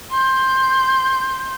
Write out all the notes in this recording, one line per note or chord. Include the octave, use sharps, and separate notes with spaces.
C6 G6